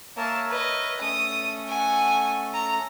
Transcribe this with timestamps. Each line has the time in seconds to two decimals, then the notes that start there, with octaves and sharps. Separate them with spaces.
0.17 A#3 A#4 C#5 E5 A5
0.49 B4 D#5
1.01 A3 C#4 A4 D#6
1.68 F#5 G#5
2.54 A#5